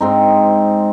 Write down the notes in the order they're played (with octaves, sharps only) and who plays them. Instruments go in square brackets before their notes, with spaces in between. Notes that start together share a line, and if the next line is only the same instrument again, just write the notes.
[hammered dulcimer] G#2 C4 D#4